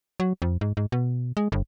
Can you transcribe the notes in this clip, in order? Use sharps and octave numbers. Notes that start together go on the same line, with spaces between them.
F#3
F2
G#2
G#2
B2
G#3
G1